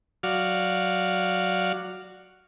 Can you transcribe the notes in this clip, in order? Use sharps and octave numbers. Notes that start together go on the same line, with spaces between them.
F#3 F#4 D5 F5 F6